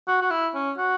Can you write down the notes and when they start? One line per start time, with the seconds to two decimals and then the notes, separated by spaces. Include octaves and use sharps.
0.08 F#4
0.22 F#4
0.31 E4
0.55 C#4
0.78 F#4